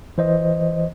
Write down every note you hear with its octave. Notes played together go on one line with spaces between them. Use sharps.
E3 C5 D#5